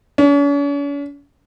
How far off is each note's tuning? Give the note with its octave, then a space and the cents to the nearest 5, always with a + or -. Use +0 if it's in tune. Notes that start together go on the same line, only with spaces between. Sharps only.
C#4 +45